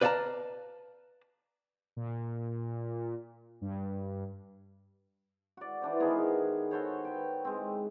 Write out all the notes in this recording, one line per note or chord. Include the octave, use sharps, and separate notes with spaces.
B4 D5 F5 F#5 A5 A#5
A#2
G2
F#4 D5
E3 D4 C5
D#3 B3 G#4 A#4
F#4 A4 C5 C#5
B4 G5
G#3 C4